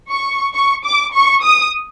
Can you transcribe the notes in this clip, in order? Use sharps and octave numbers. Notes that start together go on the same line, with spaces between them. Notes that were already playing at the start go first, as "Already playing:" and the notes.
C#6
C#6
D6
C#6
D#6